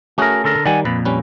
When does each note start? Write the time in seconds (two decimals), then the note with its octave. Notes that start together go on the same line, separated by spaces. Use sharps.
0.18 A3 C#4 F#4 G#4 A#4
0.44 D3 A4 A#4
0.66 D#3 G3 D5 F#5 G#5
0.85 F2 A#2 B4
1.05 G3 C#4 B4